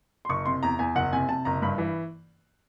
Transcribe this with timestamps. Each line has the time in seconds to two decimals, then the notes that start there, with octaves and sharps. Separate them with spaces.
0.25 C6
0.29 F#1 C#6
0.46 C3 C6
0.63 E2 A#5
0.79 E2 G#5
0.95 F#1 F#5
1.13 C3 G#5
1.29 C3 A5
1.45 F#1 A#5
1.62 G2 B5
1.78 E3